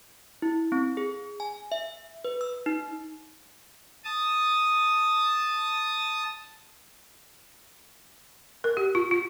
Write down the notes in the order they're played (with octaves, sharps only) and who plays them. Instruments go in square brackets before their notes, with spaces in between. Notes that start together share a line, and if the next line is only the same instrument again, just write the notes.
[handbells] E4
C4
G#4
G#5
E5
B4
E6
D#4
[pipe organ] A5 D#6
[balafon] A#4
G4
F4
F4